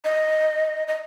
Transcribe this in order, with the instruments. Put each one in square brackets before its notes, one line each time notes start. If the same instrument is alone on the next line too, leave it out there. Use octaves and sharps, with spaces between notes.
[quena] D#5
D#5